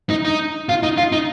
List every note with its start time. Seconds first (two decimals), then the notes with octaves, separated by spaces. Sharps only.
0.10 D#4
0.25 D#4
0.69 F4
0.83 D#4
0.98 F4
1.12 D#4